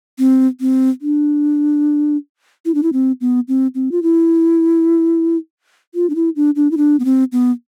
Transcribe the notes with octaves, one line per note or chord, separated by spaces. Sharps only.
C4
C4
D4
E4
D4
E4
C4
B3
C4
C4
F4
E4
F4
D4
E4
D4
D4
E4
D4
B3
C4
B3